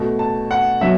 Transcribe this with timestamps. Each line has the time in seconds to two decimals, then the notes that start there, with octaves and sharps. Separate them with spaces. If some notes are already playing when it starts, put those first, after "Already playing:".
Already playing: B2 A3
0.19 A5
0.51 F#5
0.81 B2 F#3 E5